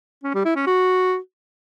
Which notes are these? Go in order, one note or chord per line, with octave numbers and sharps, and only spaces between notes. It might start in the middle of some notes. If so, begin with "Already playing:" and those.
C#4
G3
E4
C#4
F#4